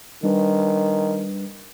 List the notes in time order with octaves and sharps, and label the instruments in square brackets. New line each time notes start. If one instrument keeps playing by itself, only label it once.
[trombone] D#3 [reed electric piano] G3 D4 B4